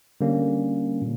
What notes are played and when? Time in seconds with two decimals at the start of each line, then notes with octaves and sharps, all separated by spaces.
0.21 D3 G3 A#3 C#4
1.02 A#2